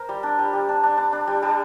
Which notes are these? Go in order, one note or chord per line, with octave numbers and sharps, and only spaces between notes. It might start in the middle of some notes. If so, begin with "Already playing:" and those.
Already playing: A#4 C5
G3
D4
G3
G3
D4
D4
D4
D4
G3
G3